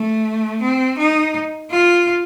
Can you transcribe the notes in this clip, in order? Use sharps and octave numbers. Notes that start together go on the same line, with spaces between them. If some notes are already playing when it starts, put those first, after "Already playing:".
Already playing: A3
C4
D#4
F4